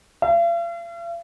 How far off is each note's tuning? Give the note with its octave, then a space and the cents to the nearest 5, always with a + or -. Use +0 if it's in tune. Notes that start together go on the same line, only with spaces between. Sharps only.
F5 -45